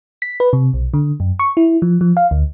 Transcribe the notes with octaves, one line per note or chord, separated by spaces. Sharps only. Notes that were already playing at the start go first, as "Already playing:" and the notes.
B6
B4
C3
B1
D3
F#2
C#6
E4
F3
F3
F5
D2